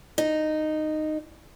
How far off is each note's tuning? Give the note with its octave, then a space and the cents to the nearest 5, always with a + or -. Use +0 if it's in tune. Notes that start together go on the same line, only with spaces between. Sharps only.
D#4 -10